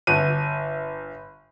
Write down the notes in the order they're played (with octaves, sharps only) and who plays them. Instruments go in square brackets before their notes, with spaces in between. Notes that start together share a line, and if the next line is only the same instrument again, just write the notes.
[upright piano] G1 D#7